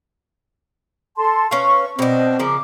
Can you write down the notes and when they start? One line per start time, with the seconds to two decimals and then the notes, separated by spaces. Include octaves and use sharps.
1.17 A4 A5 C6
1.51 C#4 B4 F5 C#6
1.99 B2 C4 D4 D#5
2.39 C#3 F3 A#4 D6